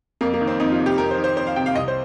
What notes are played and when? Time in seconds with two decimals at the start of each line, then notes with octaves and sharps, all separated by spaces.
0.21 F2 A#3
0.34 A#3
0.41 D#3
0.47 C4
0.60 F2 D#4
0.72 F4
0.79 C3
0.86 G4
0.98 F2 A#4
1.11 C5
1.18 D#3
1.24 C5
1.36 F2 C5
1.47 F5
1.56 C3 G5
1.66 F5
1.75 C2 D#5
1.88 C5